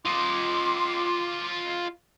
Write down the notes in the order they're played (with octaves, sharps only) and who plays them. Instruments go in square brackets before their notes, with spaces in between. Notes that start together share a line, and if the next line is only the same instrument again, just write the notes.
[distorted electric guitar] F4 D#5 [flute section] C6 D6